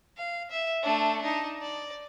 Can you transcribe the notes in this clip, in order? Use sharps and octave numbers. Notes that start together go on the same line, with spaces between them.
F5
E5
A3 D4
D4 D#4
D5